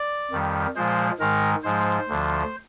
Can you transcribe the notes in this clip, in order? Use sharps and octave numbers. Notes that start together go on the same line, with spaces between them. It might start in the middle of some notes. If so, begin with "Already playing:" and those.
Already playing: D5
F2 D#3 G3
A#2 F3 G#3 C5
G#2 D#3 G#3 A#4
G#2 F3 G#3 C5
D2 D3 F3